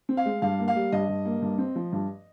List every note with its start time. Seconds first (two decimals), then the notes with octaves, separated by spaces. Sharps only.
0.09 C4
0.17 F5
0.26 G#3
0.42 G2 F5
0.59 A#3
0.68 F5
0.76 G3
0.92 G2 D#5
1.09 G2
1.26 A#3
1.42 G2
1.58 C4
1.76 F3
1.92 G2